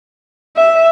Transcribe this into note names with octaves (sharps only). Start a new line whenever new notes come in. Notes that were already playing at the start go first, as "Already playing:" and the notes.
E5